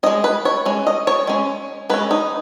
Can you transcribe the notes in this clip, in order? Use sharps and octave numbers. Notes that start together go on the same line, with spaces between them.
G#3 C#4 D#5
B4
C#5
G#3 C#4
D#5
C#5
G#3 C#4
G#3 C#4 B4
D#4